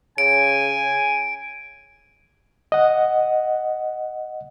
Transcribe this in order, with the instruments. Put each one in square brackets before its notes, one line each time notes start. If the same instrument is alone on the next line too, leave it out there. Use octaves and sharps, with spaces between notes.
[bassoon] C#3 [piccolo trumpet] G#5 [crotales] D7
[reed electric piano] D#5 F#5